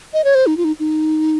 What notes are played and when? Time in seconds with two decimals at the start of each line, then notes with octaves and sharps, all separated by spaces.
0.13 D#5
0.24 C#5
0.35 C5
0.47 D#4
0.57 F4
0.64 D#4
0.79 D#4